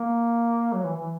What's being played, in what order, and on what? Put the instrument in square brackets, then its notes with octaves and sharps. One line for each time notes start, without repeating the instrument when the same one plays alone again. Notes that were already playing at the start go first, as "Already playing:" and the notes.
Already playing: [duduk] A#3
F#3
E3
E3